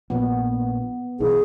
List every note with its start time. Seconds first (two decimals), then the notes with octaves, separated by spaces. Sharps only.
0.10 A#1 A#2 B3
1.20 B1 D#3 E3 G#4